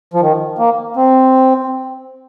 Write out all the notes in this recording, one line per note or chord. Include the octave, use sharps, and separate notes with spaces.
F3
D#3
A#3
C4